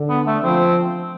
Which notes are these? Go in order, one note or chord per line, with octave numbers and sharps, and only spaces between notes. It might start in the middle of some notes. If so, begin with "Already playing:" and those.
Already playing: D3
B3
A3
F3 C4